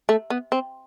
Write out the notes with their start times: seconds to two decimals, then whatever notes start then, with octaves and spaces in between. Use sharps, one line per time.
0.09 A3
0.30 B3
0.52 C4